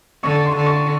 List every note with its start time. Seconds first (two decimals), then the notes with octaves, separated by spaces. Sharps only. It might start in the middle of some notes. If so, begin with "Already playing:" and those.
0.23 D3 C#6
0.45 C6
0.56 D3
0.66 C#6